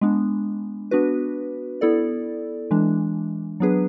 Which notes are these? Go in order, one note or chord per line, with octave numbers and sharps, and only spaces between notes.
G#3 B3 D4
B3 D4 F#4 B4
B3 E4 A4 D5
E3 G#3 D4
F#3 B3 D4 G#4 B4